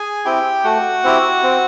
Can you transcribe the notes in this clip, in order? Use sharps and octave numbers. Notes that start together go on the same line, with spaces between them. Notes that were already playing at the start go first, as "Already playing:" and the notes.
Already playing: G#4 G#5
C4 E4 G4 G5
A3 F#4 F#5
C4 E4 G4
C4